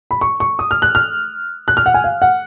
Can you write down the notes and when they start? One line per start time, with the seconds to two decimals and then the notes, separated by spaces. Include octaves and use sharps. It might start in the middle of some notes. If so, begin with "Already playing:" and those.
0.11 B5
0.21 C#6
0.40 C#6
0.59 D#6
0.71 F6
0.82 F#6
0.95 F6
1.68 F#6
1.77 F6
1.86 F#5
1.94 G#5
2.04 F5
2.22 F#5